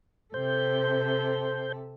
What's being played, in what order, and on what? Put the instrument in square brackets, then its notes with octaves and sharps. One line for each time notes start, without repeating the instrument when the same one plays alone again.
[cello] C3 A4 [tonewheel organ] C5 G6